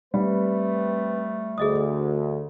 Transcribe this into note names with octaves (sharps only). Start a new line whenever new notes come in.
G3 A3 C4 B4
D2 G#4 D#5 D#6